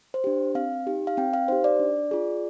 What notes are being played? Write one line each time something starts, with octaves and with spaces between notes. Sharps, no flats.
C5
D4 G4
C4 F5
D#4 G4
F5
C4 G5
F5
D#4 G4 C5
D5
D4
F4 G#4